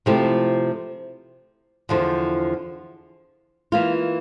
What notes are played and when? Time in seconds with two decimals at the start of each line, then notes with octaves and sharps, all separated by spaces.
0.06 C3 F3 A3 E4 G4
1.89 E2 D3 F3
3.72 E3 A#3 F4